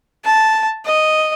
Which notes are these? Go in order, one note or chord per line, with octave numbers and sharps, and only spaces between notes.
A5
D#5